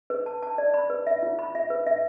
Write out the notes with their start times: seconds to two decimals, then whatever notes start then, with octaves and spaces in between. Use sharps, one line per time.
0.10 B4
0.26 A5
0.42 A5
0.58 D5
0.74 B5
0.90 B4
1.07 E5
1.23 F4
1.39 B5
1.55 E5
1.70 B4
1.87 E5